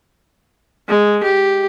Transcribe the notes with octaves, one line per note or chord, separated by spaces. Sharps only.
G#3
G4